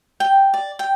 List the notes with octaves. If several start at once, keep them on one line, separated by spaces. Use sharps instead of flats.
G5
D5
G5